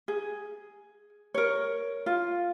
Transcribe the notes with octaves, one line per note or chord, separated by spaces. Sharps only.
G#4
A#4 C#5
F4